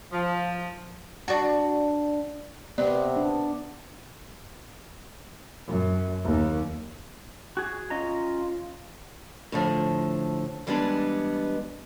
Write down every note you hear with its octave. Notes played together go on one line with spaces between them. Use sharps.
F3
D4 F#4
C3 B3 D5
D4
F#2
D#2
F#4 G#4
C#4 F4 D#5 A#5
A2 D3 F3
E3 G3 G#3 B3 D4